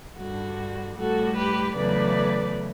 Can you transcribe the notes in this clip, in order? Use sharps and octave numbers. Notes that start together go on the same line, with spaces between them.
G2 D3 G3 F#4
A2 G3 F#4 A4
G4 B4
E2 C#3 F#3 A3 B4 D5